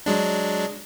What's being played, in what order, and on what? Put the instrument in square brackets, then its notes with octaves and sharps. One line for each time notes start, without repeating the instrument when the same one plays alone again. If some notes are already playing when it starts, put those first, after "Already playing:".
[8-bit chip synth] F#3 G#3 D4